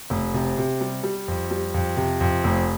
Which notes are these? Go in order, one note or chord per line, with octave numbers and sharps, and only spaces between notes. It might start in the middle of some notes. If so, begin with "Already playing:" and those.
F1
C3
C3
G3
G3
F2
G3
F2
C3
F2
F1